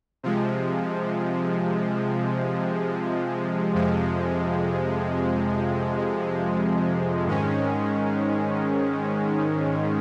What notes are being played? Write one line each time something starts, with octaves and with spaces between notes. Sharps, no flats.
C3 F3 G#3
F2 C3 F3 G#3
G#2 D#3 G#3 C#4